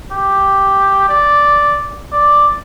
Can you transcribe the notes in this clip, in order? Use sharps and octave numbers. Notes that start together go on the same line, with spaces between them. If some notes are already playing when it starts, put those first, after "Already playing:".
G4
D5
D5